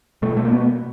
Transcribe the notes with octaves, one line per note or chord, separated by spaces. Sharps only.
B2 A3
A3
A#3
B3